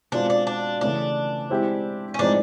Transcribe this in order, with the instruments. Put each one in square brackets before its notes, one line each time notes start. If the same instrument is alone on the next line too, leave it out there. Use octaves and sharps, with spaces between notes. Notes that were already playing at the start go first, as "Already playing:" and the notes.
[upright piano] B2 G#3 C4 F4 [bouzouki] D4
[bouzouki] D4
D4
[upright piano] C#3 E3 A3 C#4 E4 [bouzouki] D4
[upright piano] G#3 C4 E4 G4
[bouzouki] C#4
[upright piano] A2 F3 G#3 C4 D#4 [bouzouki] D4